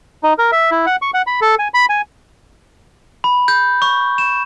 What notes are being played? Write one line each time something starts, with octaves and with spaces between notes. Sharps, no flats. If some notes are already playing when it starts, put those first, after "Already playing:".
D#4
A#4
E5
E4
F#5
C#6
F#5
B5
A4
G#5
B5
G#5
B5
G6
C#6
E7